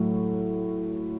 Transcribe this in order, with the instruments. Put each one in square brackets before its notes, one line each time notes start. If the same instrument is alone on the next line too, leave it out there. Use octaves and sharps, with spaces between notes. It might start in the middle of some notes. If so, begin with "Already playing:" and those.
Already playing: [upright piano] A2 F#3 A3